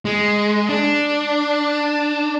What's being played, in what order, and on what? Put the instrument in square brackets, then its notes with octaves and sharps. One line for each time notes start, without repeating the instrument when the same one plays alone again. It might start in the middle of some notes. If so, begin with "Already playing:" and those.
[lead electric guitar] G#3
D4